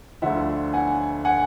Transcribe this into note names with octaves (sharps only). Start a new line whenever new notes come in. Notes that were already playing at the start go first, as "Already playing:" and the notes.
D2 D3 F3 E5 F#5
F#5 G#5
F#5 G#5